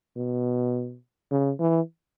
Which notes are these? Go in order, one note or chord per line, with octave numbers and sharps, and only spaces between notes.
B2
C#3
E3